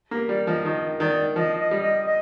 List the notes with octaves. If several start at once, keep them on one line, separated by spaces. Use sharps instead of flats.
A#3 G4
G3 D5
F3 D#5
D#3 D#5
D#3 D5
F3 D#5
D#5
G3
D#5
D#5